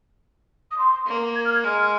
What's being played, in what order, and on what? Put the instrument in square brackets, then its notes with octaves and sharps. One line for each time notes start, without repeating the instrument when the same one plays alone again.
[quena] D#6
C6
[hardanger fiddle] A#3
[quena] G#6
F6
G#6
[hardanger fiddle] G#3 [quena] F6